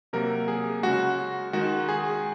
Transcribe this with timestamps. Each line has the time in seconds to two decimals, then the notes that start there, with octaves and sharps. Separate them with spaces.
0.13 C3 F#3 A#3 A#4
0.48 G#4
0.83 C#3 G#3 F#4
1.53 D#3 G#3 F#4
1.89 G#4